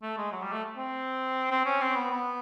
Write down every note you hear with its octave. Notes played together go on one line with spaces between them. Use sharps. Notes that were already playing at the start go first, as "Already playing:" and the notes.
A3
G#3
F#3
G3
A3
C4
C4
C#4
C4
B3
B3